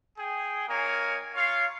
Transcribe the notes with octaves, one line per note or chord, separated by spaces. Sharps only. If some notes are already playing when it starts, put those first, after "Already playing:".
G#4 G5
A#3 D#4 A#4 C#5 G#5
F4 C#5 F5